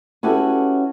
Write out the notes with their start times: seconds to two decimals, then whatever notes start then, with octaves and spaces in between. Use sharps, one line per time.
0.23 C#4 E4 F#4 G4 A4 B4